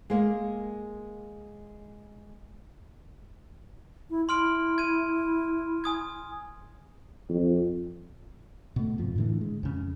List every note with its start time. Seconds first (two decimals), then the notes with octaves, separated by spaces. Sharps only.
0.10 G#3 A#3
4.10 E4
4.29 E4 C6 F6 D7
4.78 G#6 D#7
5.84 G#5 D#6 G#6
7.30 F2
8.76 B2 A3
8.98 F2 G#2 F3
9.16 A2 D3 E3
9.41 G#3
9.63 F2 C#3